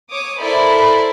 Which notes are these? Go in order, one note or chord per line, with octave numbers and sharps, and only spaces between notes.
C#5 D6 D#6
E4 A4 A#4 C5 D5 B5